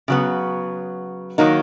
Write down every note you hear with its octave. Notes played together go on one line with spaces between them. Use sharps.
C#3 F#3 B3
D#3 F#3 A#3 D#4